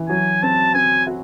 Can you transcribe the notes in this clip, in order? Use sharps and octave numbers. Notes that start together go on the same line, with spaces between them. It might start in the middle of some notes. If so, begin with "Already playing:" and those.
Already playing: E3
F#3 G#5
C4 A5
C4 G#5
F#4